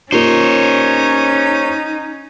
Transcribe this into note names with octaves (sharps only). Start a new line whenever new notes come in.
A#3 C#4 D#4 F4 G4 C5 C#5